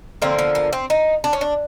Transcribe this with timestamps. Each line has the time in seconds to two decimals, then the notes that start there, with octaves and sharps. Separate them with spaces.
0.22 D3 F3 A#3 C4
0.39 B3
0.55 B3
0.73 C4
0.90 D#4
1.24 D4
1.33 C#4
1.41 D4